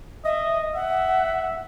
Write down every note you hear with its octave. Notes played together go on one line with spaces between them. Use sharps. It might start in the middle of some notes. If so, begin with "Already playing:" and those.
D#5 E5
E5 F#5